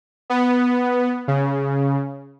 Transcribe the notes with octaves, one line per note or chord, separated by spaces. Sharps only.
B3
C#3